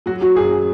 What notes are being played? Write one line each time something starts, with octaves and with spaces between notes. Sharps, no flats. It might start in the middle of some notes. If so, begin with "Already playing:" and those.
F#3 F#4
F#3 F#4
F#2 G#4